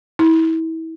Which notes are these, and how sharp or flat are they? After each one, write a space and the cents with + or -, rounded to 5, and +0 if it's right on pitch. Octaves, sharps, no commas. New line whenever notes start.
E4 -30